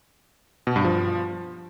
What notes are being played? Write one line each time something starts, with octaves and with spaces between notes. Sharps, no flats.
B2
G2
F3